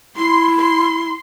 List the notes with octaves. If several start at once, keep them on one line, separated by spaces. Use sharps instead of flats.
E4 C6
C6